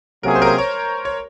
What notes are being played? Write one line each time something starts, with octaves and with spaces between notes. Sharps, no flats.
C3 F#3 A#3 C#4 G#4 A#4
C5
A#4
C5
C#5
C#5